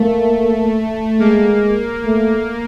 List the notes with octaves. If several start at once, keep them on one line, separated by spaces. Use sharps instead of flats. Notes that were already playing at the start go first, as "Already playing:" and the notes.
Already playing: A3 A#3
G#3 A#3
A3